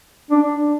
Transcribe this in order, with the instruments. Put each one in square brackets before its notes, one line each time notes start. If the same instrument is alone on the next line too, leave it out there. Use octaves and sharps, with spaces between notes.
[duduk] D4